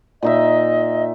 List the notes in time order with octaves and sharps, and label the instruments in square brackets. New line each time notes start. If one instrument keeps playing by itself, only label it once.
[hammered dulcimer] A#2 D#4 E5 [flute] D#5